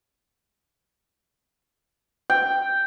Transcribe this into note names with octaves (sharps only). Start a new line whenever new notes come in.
G5